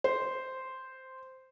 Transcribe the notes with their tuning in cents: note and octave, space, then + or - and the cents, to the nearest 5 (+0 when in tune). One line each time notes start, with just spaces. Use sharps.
C5 -5